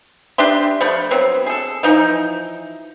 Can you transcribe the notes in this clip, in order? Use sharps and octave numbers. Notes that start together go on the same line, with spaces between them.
D4 G4 E5 C6
F3 A3 B5
F#3 B3 C4
G#4 A4
E3 F3 D#4